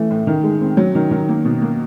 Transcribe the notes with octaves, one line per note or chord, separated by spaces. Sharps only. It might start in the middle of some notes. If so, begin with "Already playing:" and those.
Already playing: E3 A3
A2
D#3
G#3
C4
F#3
D#3
D#3
A#3
B2
A#3